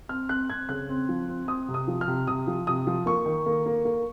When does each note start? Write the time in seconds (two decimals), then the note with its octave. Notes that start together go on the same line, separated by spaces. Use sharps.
0.09 C4 F6
0.29 C4 F#6
0.49 C4 G#6
0.69 C#3 F#6
0.89 C4
1.09 F3
1.29 C4
1.48 C4 D#6
1.69 C3
1.74 D#6
1.88 F3
2.01 F6
2.08 C3
2.27 C3 D#6
2.47 F3
2.67 C3 D#6
2.87 F3
3.06 A#3 C#6
3.26 D#3
3.46 A#3
3.66 A#3
3.85 A#3